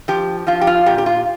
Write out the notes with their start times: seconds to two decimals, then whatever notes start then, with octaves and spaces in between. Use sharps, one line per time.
0.08 F3 G4
0.47 F3 F4
0.61 G4
0.67 F4
0.86 A#2 G4
0.98 G4
1.06 F4